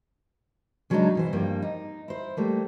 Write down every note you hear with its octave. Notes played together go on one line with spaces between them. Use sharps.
C#3 F#3 G#3 C4 D4 D#4
B2 E3 C5
G2 F3 G3 A#3
D#4
E4 C5
G3 A3 A#3